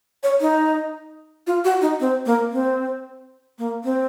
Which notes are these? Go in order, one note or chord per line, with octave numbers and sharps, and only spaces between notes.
C#5
D#4
F4
F#4
D#4
C4
A#3
C4
A#3
C4